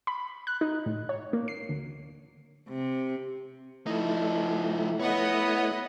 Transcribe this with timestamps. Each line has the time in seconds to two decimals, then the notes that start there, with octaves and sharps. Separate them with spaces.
0.07 B5
0.47 F#6
0.61 D#4
0.86 A2
1.09 C#5
1.33 A#3
1.48 C7
1.69 D2
2.69 C3
3.87 F3 A3 D#4 E4
5.00 B3 C#5 D#5 F#5 B5